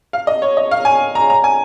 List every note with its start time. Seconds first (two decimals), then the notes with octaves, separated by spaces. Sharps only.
0.13 F5
0.27 D#5
0.42 C#5
0.57 D#5
0.71 F5
0.85 G#5
1.15 A#5
1.30 A#5
1.44 G#5